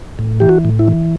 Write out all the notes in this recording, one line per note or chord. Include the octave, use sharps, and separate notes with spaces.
A2
E3 G4
F#4
A2
E4
E3